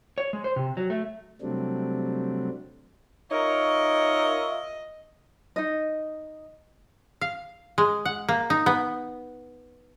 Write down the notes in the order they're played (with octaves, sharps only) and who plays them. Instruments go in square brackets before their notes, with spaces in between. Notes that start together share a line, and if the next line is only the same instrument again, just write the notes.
[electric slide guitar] C#5
G#3
C5
C3
F#3
A3
[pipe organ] C3 F#3 G3 A3 C4 D4
[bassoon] D#4 [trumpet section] F4 E5 [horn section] A#4 C#5 [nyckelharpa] D#5
[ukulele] D#4 D#5
[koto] F5
G#3
F#5
A#3
D#4
B3